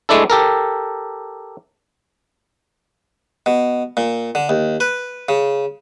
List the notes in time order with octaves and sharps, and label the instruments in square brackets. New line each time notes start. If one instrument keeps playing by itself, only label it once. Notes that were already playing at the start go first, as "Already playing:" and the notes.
[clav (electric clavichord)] G#3 A3 D4 E4 A4
G4 A4 A#4
[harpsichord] B2
A#2
D3
D#2
B4
C#3